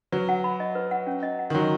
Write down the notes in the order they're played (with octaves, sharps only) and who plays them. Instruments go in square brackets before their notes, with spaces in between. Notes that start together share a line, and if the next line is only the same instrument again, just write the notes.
[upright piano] F#3 [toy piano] B4
[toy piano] F#5
B5
D#5
B4
F#5
C#4
D#5
F#5
[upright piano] D#3
[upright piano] F#3 [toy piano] F#4